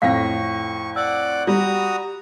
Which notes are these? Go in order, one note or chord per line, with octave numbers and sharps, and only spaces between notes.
F2 A2 F5 C#6 A#6 B6
D5 F#5 D6 E6
G3 F#4 A#5 D#6